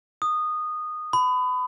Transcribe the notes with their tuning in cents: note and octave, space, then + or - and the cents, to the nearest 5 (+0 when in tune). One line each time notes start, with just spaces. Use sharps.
D#6 -15
B5 +30